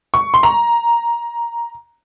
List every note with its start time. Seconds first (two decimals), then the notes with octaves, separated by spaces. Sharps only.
0.14 C#6
0.34 C6
0.43 A#5